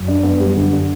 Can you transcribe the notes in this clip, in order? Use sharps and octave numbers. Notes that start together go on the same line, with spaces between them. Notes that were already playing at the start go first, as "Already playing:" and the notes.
Already playing: F#2 F#3
D4
B3
G3
D3
D4